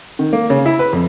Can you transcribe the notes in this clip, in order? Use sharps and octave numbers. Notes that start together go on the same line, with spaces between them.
D#3
A#3
C#3
E4
B4
F2